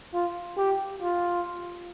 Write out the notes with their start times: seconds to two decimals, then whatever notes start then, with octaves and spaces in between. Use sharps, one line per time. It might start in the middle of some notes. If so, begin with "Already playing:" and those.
0.14 F4
0.57 G4
1.02 F4